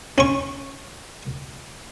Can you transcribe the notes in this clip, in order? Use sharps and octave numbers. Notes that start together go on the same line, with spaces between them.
C#4 C#6